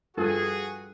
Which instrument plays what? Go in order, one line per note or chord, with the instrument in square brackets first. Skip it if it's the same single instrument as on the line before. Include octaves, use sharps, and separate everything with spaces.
[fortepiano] G2 F3 A4 [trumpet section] F#4 G#4